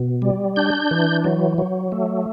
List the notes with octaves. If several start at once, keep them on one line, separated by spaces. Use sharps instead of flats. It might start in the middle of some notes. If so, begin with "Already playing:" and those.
Already playing: B2
G3
D4 G6
E3
F#3
F#3
A3